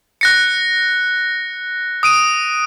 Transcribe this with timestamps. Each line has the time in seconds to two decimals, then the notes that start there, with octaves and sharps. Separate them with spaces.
0.21 F#6 A#6 C#7
2.03 D#6 D7 D#7